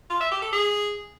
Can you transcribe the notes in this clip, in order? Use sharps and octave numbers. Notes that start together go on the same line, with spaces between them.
F4
E5
G4
A4
G#4